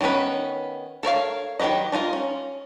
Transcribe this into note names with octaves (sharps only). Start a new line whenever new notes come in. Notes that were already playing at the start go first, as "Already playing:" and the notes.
D#3 G3 B3 C#4 B4
A4 A#4 C#5 F5
D#3 F#3 G4 B4 D#5
D4 D#4 F4 A#4
C#4